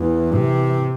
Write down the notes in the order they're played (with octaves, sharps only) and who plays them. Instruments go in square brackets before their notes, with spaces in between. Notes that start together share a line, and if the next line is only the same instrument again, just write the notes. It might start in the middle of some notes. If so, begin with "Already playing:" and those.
Already playing: [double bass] E2 [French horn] E3
[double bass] C3